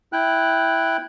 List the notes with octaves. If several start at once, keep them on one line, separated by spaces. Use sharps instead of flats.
E4 G5 F#6